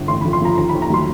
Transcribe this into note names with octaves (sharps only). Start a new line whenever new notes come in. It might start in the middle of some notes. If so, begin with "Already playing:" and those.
Already playing: G1
A1 C6
B5
F3
C6
F3 A#5
D#2 A#5
B5
D#2
A#5
F#3 C6